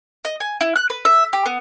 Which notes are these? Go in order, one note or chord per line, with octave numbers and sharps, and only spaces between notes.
D#5
G#5
E4
F#6
B4
E5
G4
B3